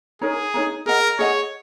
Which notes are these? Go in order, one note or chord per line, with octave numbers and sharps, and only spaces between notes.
D#4 G#4 A#4 C#5 A#5
D#4 A#4 C#5 A#5
G#4 A#4 D#5 F#5
G#4 C#5 D#5 F#5